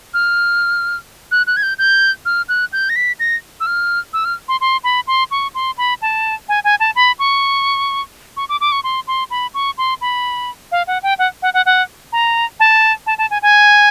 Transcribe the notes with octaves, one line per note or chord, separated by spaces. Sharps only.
F6
F#6
F#6
G#6
G6
G6
F6
F#6
G6
A#6
B6
A#6
E6
F6
E6
F6
C6
C6
B5
C6
C#6
C6
B5
A5
G#5
G#5
A5
B5
C#6
C#6
D6
D6
C#6
C6
C6
B5
C#6
C6
B5
F5
F#5
G5
F#5
F#5
F#5
F#5
A#5
A5
A5
A5
G#5
G#5